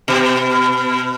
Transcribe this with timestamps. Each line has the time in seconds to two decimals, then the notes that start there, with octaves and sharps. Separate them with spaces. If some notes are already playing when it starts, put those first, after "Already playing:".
0.08 B2